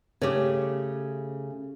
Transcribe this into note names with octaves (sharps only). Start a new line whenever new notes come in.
C#3 A3 G4 C#5